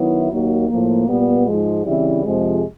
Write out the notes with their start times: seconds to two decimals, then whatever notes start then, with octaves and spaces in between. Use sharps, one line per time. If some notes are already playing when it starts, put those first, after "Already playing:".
Already playing: D#3 F#3 B3 E4
0.30 D#2 D#3 F#3 A#3
0.69 A2 F3 A#3
1.08 A#2 G3 B3
1.47 G#2 F3 G#3
1.86 C#3 E3 G3 C4 E4
2.24 F2 C3 F3 G#3